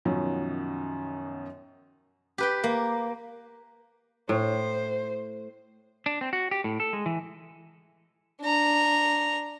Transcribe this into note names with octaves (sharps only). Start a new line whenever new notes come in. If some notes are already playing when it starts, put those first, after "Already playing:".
F#2 B2 D#3 F3 F#3
G4 B4 G5
A#3
A2 C5
D4
C4
F#4
G4
A2
A4
G#3
E3
D4 A#5